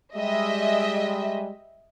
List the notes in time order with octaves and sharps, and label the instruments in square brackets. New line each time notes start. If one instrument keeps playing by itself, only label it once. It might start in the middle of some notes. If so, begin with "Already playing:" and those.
[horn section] G3 G#3 [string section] D#5 E5